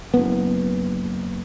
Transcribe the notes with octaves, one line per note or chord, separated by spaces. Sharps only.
F#1 B3